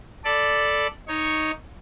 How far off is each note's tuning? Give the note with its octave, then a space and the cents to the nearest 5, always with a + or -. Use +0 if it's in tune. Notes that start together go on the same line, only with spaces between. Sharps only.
A4 +0 D5 +0 B5 +0
D#4 +0 C#5 +0 C#6 +0